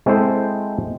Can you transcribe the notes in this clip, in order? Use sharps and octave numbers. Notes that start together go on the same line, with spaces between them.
G#3 C4 E4 A4 C5